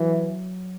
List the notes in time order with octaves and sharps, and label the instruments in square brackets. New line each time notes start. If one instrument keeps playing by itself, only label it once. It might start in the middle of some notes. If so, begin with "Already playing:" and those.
Already playing: [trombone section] E3 [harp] F#3